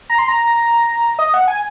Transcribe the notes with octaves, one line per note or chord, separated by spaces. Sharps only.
A#5
C6
A#5
D#5
F#5
G#5